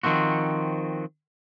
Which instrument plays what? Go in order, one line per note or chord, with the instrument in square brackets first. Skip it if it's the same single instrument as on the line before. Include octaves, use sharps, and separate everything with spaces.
[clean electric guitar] D#3 F3 C4 F#4